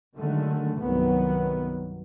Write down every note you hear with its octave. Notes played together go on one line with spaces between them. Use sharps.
D3 D#3 F#3 G#3 A3
C2 G2 D#3 F#3 B3